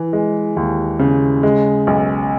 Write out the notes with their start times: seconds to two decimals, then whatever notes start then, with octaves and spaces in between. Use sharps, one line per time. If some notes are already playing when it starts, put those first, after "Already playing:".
Already playing: E3
0.13 G#3
0.57 D#2
0.99 C#3
1.43 G#3
1.87 B1